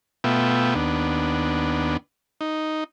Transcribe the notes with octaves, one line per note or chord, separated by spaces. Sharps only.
B2 A3 B3 F4 E5 G5
D#2 B3 D4
D#4